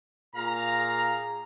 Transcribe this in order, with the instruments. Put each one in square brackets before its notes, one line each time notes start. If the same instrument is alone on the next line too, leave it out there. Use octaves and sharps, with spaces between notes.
[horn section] A#2 G#4 F5 A#5